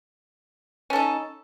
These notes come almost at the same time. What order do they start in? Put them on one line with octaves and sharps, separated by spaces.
C#4 A4 D#4